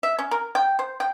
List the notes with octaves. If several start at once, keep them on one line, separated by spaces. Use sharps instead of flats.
E5
C#4
A#4
G5
C5
G5